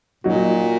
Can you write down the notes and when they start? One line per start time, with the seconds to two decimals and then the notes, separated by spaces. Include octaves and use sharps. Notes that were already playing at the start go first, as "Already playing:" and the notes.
0.24 A#2 F#3 D#4 F#4